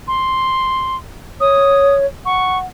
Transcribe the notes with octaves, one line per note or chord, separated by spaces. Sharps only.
C6
C#5 D#6
F#5 C#6